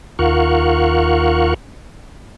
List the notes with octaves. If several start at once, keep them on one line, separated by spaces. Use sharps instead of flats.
D#2 F4 A#4 F5 F#5 C#6